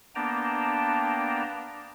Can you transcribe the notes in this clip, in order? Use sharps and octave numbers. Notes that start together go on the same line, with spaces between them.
A#3 B3 D4 G5 A5 A#5